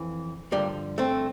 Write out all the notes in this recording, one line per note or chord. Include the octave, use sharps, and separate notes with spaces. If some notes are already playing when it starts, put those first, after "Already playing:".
Already playing: F2 E3
G2 D3 F3 G3 A#3
A3 C4